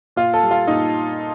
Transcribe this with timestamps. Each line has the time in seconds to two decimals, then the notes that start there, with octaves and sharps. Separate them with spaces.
0.16 A#2 F4
0.34 A4
0.43 G3
0.51 F4
0.67 A#2 D#4